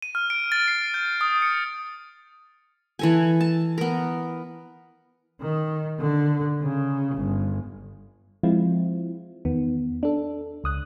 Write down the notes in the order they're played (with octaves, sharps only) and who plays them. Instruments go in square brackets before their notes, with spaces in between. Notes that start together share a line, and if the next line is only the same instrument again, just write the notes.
[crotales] D#7
F6
D7
A6
C7
G6
D#6
C#7
[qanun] E3 A4 G#5
A5
B3 A#4
[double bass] D#3
D3
C#3
G1
[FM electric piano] F3 G#3 C4 E4 F4
E2 D#3 B3
D4 A4
C#2 D#6 F#6